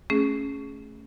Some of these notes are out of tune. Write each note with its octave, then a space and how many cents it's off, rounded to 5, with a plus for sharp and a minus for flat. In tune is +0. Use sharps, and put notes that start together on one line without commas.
A3 +0 C#4 +0 G#4 +0